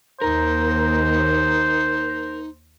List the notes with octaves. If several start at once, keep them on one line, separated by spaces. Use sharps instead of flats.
D#2 D#4 A#4 C5